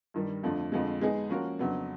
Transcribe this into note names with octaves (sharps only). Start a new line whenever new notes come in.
G2 D#3 G3
F2 D3 F3 A3 D4
F2 D3 F3 G#3
G#3 B3 D#4 G#4
F3 A#3 C#4 F#4 A#4
F2 C#3 F#3 B3 D4